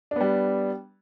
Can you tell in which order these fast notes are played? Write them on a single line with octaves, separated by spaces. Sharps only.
D4 B3 G3